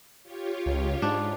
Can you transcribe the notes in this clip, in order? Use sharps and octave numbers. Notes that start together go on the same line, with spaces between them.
F4 G4 C#5
C#2
G#2 D4